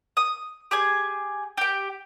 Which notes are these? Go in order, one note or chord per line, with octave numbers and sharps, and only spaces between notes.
D#6
G4 G#4 G#5
G4 G5